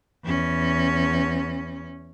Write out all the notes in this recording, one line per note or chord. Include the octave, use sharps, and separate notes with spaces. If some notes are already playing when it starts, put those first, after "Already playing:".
E2 C#4